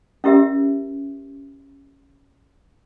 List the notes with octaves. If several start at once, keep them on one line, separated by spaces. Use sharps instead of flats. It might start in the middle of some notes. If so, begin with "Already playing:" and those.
C#4 E4 G4 A#4 E5